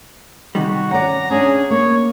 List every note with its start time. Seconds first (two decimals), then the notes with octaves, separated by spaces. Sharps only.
0.55 C3 D#3 G3 F#4
0.91 C#4 D5 F#5 A#5
1.30 C#4 D4 G#4
1.70 A#3 C#5